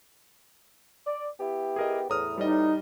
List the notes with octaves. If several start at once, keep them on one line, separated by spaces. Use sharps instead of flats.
D5
B3 E4 G4
G#4 A#4 D#5
E2 A2 A#5 D#6 F6
G3 D#4 D5 D#5